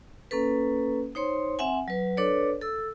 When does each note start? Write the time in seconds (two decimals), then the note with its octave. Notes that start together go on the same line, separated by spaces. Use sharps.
0.31 A#3 C#4 A4 B4
1.15 D#4 C5 C#5 C6
1.59 C4 E5 F#5 G#5
1.88 F#3 B4
2.17 D4 A4 B4 C#5 D5
2.61 A4 E6